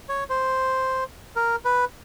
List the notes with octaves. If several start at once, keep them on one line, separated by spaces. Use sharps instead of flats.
C#5
C5
A#4
B4